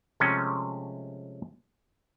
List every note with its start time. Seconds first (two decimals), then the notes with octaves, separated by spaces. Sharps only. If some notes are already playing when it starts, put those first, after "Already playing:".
0.20 C3 F3 G#3 A3 C#4